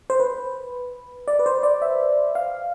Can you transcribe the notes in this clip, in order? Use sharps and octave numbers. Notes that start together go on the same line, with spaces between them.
C5
B4
D5
B4
C5
D5
E5
F5